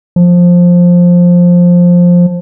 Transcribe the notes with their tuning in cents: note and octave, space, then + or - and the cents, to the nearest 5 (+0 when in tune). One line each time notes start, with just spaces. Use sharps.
F3 +10